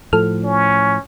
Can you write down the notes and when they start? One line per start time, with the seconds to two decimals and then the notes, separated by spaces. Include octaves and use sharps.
0.13 A2 F3 A4 F6
0.44 C#4